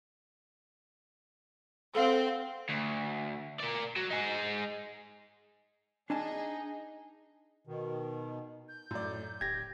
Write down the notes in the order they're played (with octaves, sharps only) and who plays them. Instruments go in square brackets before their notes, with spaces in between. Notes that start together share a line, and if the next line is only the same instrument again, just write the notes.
[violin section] C4 [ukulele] A4 F5 F#5
[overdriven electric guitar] D2
A#4 D5
F#3
D#4 G#4
[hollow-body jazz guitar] D4 G#5 A5 [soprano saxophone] D#4 [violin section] G#4
[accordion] B2 D#3
[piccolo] G6
[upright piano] F#2 D5 [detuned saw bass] A2
[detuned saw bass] D1 [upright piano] G4 [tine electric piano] G#6 A#6